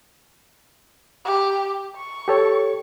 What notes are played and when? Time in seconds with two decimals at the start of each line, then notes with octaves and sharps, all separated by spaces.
1.26 G4
1.97 C#6
2.28 G4 A4 C#5